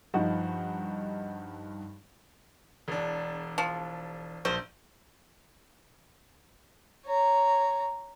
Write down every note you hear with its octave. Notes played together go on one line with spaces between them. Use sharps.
G2 F3 D#4 F#4
E1 D4
F3
A#1 C5
C#5 A#5